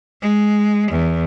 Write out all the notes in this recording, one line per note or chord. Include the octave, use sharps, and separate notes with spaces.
G#3
E2